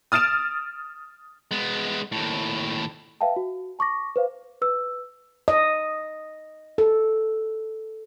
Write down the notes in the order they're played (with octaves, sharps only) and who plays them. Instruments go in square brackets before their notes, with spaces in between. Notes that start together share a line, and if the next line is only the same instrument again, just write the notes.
[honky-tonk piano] D#6 F6 A6 D7 E7
[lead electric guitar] G#3 B3
D#2 A2
[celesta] B4 E5 F5 G5 A5
F#4
A5 C#6 D6 A#6
B4 C5 F5
B4 E6
[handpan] D#5
A4